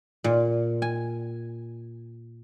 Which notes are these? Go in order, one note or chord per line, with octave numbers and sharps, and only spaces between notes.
A#2
G#5